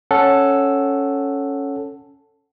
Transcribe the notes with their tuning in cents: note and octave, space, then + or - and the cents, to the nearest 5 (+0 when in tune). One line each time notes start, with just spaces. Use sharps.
C#4 +0 A4 +0 F#5 +0